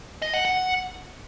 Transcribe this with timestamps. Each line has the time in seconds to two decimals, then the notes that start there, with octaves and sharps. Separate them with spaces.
0.22 D#5
0.34 F#5
0.45 F#5